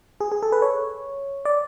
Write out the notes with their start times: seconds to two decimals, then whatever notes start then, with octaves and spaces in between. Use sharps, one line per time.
0.20 G#4
0.32 G#4
0.43 A4
0.52 B4
0.62 C#5
1.45 D5